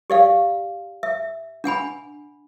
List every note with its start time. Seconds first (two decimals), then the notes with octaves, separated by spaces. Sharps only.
0.10 G4 D5 F5
1.03 E5
1.64 D4 F#5 G#5 B5